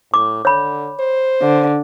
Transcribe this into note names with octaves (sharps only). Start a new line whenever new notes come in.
A2 D6
D3 C#5 B5
C5
D3